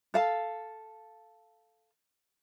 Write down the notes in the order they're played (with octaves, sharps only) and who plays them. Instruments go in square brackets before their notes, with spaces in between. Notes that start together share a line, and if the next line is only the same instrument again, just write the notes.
[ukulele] A4 F5 A5